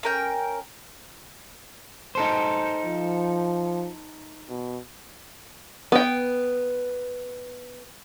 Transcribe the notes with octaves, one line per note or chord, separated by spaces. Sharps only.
C#4 A#4 G5
D#4 A4 C5
F3
B2
B3 G5